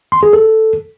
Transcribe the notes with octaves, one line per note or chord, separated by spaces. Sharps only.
C6
G#4
A4